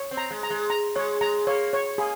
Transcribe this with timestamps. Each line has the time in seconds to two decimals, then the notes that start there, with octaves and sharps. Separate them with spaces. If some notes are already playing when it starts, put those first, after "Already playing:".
Already playing: C#5
0.11 C4
0.17 A#5
0.30 G#3
0.43 A#5
0.50 G#3
0.70 A#5
0.95 G#3 C#5
1.21 G#3 A#5
1.47 A#3 C#5
1.73 C#5
1.98 A#3 G#4